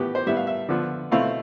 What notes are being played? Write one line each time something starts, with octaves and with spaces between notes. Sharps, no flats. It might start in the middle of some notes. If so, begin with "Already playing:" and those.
Already playing: A2 E3 B3 G4
C5
A2 G3 B3 E5
F5
E5
D3 F3 B3
B2 A3 C4 E4 F5